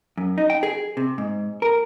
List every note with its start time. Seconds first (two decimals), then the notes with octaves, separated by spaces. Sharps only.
0.18 F#2
0.38 D#4
0.50 G5
0.63 G#4
0.97 C3
1.18 G#2
1.62 A#4